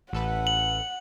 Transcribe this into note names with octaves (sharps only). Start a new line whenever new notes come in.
A1 A4 B4 F#5
F#7